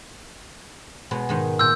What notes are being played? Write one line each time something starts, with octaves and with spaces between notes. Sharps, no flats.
B2 G#3 B3
G#2 D#3 G#3
A#2 E6 G6